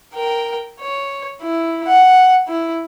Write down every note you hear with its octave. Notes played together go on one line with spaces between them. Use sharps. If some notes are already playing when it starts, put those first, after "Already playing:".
A#4 G5
C#5
E4
F#5
E4